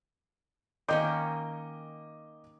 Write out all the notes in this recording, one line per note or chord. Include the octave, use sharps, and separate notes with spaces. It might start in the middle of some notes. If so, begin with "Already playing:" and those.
D#3 A#3 C#4 D#5 D6 G6